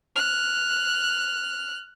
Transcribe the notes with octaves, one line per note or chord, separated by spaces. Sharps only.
F6 F#6